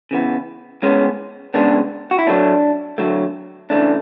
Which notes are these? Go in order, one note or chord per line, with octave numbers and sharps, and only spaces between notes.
C#3 E3 B3
A2 G#3 B3 C#4
C#3 G#3 B3 D4
F#4
E4
A2 F#3 A3 D4
D3 F#3 A3
C#3 E3 A3 D4